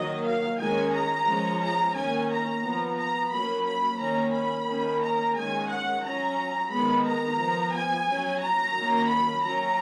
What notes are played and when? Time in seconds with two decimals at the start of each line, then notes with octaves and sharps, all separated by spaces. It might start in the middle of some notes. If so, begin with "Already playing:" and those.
Already playing: D#3 F#3 A#3 D#5
0.25 F5
0.59 D#3 G#3 C#4 G#5
0.93 A#5
1.28 F3 G#3 C#4
1.61 A#5
1.96 D#3 A#3 C#4 G#5
2.30 A#5
2.64 F3 B3
2.98 A#5
3.31 F#3 A#3 C#4 B5
3.66 B5
3.99 D#3 A#3 C#4 A#5
4.34 B5
4.67 D#3 A#3 C#4
5.02 A#5
5.36 D#3 G#3 C#4 G#5
5.70 F#5
6.04 F#3 C#4 A#5
6.72 D#3 G#3 B3 B5
7.06 A#5
7.39 F3 B3
7.73 G#5
8.07 F#3 C#4
8.41 A#5
8.75 D#3 F#3 A#3 C#4
9.10 B5
9.43 F#3 C#4 A#5